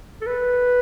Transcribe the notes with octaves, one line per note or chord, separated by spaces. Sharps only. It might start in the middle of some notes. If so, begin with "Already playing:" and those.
A4
B4